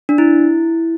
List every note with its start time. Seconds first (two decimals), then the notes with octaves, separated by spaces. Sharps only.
0.09 D4
0.18 E4